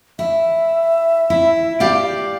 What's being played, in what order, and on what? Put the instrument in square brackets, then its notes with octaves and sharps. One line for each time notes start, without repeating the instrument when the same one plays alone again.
[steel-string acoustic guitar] E4 [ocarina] E5
[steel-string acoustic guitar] E4
G4 D5 F5